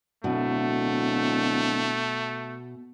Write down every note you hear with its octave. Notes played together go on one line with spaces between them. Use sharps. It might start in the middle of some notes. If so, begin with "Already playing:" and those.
D1 B2 A3